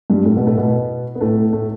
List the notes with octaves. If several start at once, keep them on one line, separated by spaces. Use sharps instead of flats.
G2 G3
A2 A3
B2 B3
A2 A3
B2 B3
B3
A2 A3
A2 A3